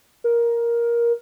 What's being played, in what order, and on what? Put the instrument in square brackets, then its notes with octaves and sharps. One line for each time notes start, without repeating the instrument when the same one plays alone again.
[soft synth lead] A#4